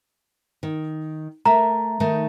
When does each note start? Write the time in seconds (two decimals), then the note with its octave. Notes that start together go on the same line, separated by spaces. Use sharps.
0.63 D#3
1.46 A3 A#4 E5 A#5
2.00 D#3 A3 D#4